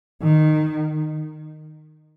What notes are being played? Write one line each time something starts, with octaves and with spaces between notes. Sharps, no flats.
D#3